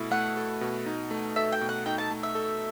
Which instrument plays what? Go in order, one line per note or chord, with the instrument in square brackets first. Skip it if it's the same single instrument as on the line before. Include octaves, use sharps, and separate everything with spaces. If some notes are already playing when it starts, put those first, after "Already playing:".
Already playing: [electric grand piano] B2 A3 E4 A4
[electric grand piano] A3 [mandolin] F#5
[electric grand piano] A4
B2
D#4
A3
[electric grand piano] A4 [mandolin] E5
[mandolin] G5
[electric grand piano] B2
[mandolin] F#5
[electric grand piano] D#4 [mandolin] G5
[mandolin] A5
[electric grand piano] A3
[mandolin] E5
[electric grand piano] A4